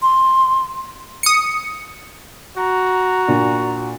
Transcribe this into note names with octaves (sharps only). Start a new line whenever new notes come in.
C6
D#6 C#7
F#4 A#5
A#2 D4